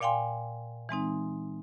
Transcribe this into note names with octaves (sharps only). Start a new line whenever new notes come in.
A#2 D5 F5 G5 G#5 C6
E3 G#3 C4 D#4